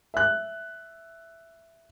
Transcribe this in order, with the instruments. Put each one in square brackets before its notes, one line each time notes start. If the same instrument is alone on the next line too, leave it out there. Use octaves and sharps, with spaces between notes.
[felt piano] E5 F#6